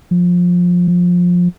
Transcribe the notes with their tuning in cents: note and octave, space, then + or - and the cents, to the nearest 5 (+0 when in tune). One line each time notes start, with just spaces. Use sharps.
F3 +20
F3 +20